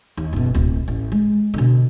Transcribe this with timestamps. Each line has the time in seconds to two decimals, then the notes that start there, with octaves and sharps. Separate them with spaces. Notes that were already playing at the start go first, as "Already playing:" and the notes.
0.17 D#2
0.33 F#1 B2
0.55 D1
0.88 A1
1.12 G#3
1.54 B2 D3